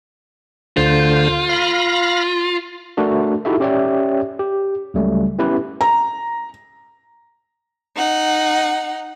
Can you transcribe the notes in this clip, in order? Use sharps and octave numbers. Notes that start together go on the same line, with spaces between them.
D2 D3 F4 C5
F5 B5 A#6
A3 D4 F#4 A#4
D#4 E4 F#4 G4 A4 E5
C#4 G4 C#5 D5 E5 G5
G4
C#2 C#3 F#3 G3 A3
B3 C#4 E4 G4 B4
A#5
D#4 F#5